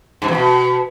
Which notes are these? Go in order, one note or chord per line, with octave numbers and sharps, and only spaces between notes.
G2
E2
B2